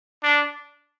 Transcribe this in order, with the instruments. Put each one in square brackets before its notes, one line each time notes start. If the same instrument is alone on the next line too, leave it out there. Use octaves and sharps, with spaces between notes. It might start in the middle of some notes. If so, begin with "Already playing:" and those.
[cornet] D4